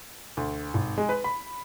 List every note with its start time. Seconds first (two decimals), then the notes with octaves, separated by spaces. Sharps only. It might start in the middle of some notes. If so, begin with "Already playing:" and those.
0.37 D2
0.74 G#1
0.98 G#3
1.09 B4
1.24 B5